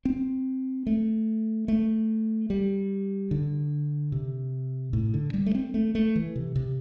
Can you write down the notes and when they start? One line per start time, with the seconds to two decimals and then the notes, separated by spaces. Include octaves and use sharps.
0.05 C4
0.87 A3
1.68 A3
2.50 G3
3.31 D3
4.12 C3
4.93 A2
5.14 D3
5.34 G3
5.46 A3
5.55 C4
5.74 A3
5.95 A3
6.16 E3
6.36 C3
6.56 C3